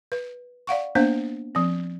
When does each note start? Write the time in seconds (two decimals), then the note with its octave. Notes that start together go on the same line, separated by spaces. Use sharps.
0.12 B4
0.67 D5 F5 F#5 C#6
0.95 A#3 B3 D4 C5 F5
1.55 F3 C4